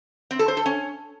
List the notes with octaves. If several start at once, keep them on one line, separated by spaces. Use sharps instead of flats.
C4
A4
C5
A4
C#4